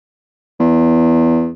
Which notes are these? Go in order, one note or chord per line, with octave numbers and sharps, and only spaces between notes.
E2